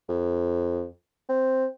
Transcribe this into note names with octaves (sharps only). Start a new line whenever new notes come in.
F2
C4